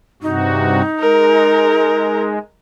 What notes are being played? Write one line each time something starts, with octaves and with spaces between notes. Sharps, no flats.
G2 C3 D#4 F#4
G#3 A#4